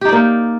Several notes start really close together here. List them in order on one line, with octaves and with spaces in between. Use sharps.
G4 D#4 D5 A#3